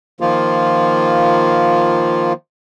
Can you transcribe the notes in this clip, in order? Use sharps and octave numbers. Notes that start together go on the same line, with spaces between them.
D#3 F3 A#3 F4